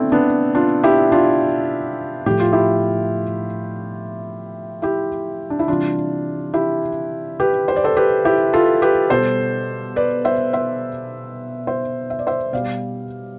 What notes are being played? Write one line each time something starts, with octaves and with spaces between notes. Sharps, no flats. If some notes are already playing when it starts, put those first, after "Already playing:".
Already playing: B2 A3 C4 D4 E4
B3 D4
D4 F4
E4 G4
D4 F4
A2 F3 G4
F4
E4 G4
E4 G4
D4
E4
C3 E3 G3 D4 F4
E4 G4
G4 B4
C5
D5
A4 C5
G4 B4
E4 G4
F4 A4
G4 B4
B2 G3 A4 C5
B4 D5
C5 E5
C5 E5
C5 E5
E5
D5
C5 E5
B2 G3 D5 F5